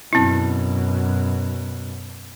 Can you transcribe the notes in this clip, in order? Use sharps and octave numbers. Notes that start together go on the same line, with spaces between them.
F#2 B2 C4 E4